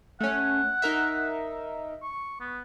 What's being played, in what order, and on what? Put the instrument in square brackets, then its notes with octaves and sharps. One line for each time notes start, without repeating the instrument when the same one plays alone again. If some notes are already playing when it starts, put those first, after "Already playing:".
[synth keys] A3 C#4 [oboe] F#5
[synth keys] D#4 A#4 E5
[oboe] C#6
B3